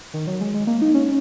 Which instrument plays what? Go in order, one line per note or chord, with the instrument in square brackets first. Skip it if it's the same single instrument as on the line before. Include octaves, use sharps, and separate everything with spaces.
[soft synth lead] D#3
F#3
G#3
G#3
A#3
D#4
C#4